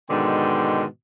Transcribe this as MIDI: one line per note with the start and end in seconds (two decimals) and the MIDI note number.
0.10 0.85 44
0.10 0.85 47
0.10 0.85 50
0.10 0.85 51
0.10 0.85 79
0.10 0.85 84